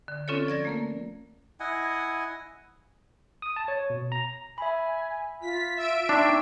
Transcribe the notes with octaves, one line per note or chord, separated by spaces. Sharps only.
D3
C4 C#4 F4 A4 C#5
F3 D5 G#6 A#6
A3 A#3 A#4
E4 D#5 F#5 G#5
D#6
A5
C#5
B2
A#5
E5 G#5 B5
F4 B6
E5 E6 D7
D4 D#4 G5 C6 C#6